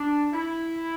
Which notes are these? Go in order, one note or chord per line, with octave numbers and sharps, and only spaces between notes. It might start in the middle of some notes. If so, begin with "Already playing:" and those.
Already playing: D4
E4